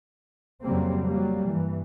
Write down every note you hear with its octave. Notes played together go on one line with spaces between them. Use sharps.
F2 C#3 F#3 G3 A#3 C4
F#3 G3 A#3
G2 E3